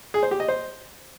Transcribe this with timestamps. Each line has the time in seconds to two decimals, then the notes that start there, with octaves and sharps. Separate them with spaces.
0.14 G#4
0.23 C5
0.31 G4
0.40 D#5
0.48 C5